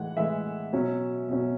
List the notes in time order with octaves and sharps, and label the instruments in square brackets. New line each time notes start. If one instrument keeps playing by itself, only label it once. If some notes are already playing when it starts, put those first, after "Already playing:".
Already playing: [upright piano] A2 E3 G#3 F#5
A2 E3 G#3 E5
B2 F#3 C#4
B2 F#3 C#4